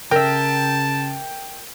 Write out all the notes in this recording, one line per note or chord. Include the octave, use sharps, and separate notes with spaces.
C#3 A#4 E5 G5 A5